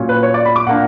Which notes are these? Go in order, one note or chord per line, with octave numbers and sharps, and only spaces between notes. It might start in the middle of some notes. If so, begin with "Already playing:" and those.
Already playing: A#2 F#3 C#4
B4
C#5
D5
B5
D6
A#2 A#3 D4 F#5